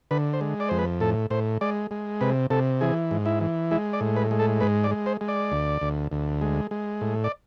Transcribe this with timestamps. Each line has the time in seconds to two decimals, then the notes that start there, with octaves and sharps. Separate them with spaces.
0.11 D3 B4
0.33 C5
0.41 G#3
0.60 D5
0.69 F2 C5
0.79 B4
1.01 A2 A4
1.30 A2 C5
1.61 G#3 D5
1.91 G#3
2.21 C3 B4
2.50 C3 A4
2.81 E3 G#4
3.11 G#2
3.26 E4
3.41 E3
3.71 G#3 E4
3.93 D5
4.01 A2
4.16 B4
4.31 G#3
4.39 A4
4.61 G#2 B4
4.84 D5
4.91 G#3
5.06 C5
5.21 G#3
5.28 D5
5.52 D2
5.81 D2
6.12 D2
6.41 G#3
6.71 G#3
7.01 A2
7.24 D5